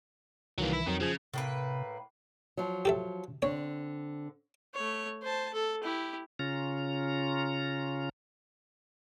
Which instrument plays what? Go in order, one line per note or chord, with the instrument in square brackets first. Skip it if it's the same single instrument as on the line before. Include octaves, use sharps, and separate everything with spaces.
[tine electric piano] C2 D#3 E3 [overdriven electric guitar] F#3 A#3
[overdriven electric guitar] E4
[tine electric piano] F2 F#3 [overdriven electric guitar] D#3
[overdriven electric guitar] C#3 [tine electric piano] F3 G#4 G#6
[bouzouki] A2 A#3 B4 [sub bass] C3
[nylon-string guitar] F3 F#3
[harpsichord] G4 A4 E5
[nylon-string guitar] D3 C4 [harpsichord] C#5
[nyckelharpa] A3 C#5
C5 A5
A4
E4 G4
[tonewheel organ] C#3 C#4 F4 A#5